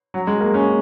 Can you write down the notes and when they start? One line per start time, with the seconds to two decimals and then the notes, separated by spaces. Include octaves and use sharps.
0.14 F#3
0.27 G#3
0.41 A#3
0.54 C#4